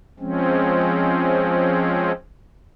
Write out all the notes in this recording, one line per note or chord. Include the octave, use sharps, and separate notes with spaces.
F3 G#3 C4 C#4